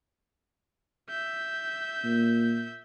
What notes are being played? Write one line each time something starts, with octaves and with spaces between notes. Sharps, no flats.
E5 G6
A#2